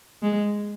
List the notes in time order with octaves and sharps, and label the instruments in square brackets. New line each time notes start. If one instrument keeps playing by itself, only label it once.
[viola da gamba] G#3